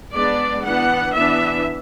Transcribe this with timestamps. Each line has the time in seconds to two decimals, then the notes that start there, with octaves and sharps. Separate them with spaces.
0.13 G#3 B3 D4 D5
0.65 E3 B3 D4 F#5
1.16 E3 B3 D4 E5